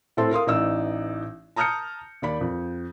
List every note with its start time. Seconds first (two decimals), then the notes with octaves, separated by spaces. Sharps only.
0.17 A2 C4 A4 C6
0.31 A#4 F5 C6 D#6
0.47 A1 E3 D#4 D5 E6
1.56 A5 A#5 D#6 F6 G6 C#7
2.22 D#2 D5 B5
2.41 F2